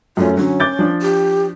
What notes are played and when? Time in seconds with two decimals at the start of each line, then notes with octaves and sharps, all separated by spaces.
0.17 F#2 A3 C#4 F4
0.37 D3 F#3 C#4
0.60 D6 G6 A6
0.79 F3 D4
1.02 G4